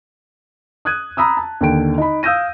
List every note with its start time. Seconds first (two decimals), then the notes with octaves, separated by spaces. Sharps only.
0.85 D#6 F#6 G#6 D#7
1.17 A#5 B5 D#6 E6
1.37 A5
1.61 D#2 D3 G5 D7
1.98 D#4 B5
2.23 F5 D#6 E6 G6 A#6 D#7